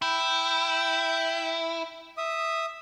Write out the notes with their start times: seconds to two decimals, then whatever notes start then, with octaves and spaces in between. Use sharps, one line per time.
0.02 E4 G5 G6
2.17 E5 D#6